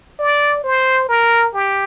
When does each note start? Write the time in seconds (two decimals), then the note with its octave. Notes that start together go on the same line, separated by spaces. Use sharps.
0.19 D5
0.64 C5
1.09 A#4
1.54 G4